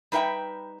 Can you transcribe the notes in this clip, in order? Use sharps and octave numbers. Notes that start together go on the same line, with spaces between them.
G3 D#4 B4 E5 G5